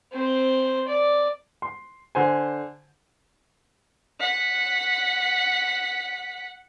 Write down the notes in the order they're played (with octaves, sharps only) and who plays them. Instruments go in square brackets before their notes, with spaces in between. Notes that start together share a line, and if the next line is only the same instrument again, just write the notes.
[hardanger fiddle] C4 C5
D5
[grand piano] C6
D3 C5 G#5
[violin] F#5 B6